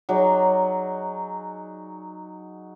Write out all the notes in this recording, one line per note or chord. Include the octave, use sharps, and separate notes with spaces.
F#3 D#4 G#4 D5